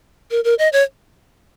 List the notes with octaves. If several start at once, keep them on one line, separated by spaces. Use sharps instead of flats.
A#4
A#4
D#5
C#5